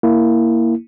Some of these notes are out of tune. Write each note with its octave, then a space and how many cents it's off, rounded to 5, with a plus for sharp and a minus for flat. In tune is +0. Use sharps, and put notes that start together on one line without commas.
A#3 +0 E4 +0